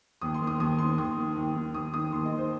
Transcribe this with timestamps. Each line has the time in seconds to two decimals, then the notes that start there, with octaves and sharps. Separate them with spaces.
0.21 D#2 D#6
0.34 C6
0.41 D#3
0.47 D#6
0.60 D#2 D#6
0.78 D#3 C6
0.98 D#2 D#6
1.17 D#3
1.37 D#2
1.55 D#3
1.74 D#2 D#6
1.93 D#3 D#6
2.12 D#2 C6
2.25 D#5
2.32 D#3
2.38 C5